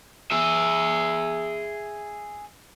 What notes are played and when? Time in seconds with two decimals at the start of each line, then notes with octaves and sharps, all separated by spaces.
0.31 G#4 E5